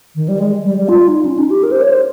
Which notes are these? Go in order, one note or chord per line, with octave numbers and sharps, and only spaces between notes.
D#3
G3
G#3
G3
G3
F4
D#4
C#4
D#4
G4
A#4
C5
C#5
C5